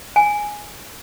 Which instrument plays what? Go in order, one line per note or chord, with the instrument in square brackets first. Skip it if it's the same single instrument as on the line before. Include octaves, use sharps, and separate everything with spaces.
[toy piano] G#5